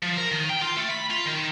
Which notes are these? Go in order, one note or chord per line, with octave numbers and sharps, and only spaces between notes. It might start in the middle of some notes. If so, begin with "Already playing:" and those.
F3
A#4
D#3
G5
F4
A3
B5
F4
D#3